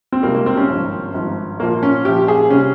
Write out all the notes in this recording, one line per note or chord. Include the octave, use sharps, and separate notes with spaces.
C4
C#2 C3 G3 A#3
A#3
C4
C#4
G#1 G2 F3
G#1 G2 F3
A#1 A#2 F3 A#3
C#4
A#1 A#2 F3 G4
G#4
C3 G3 C#4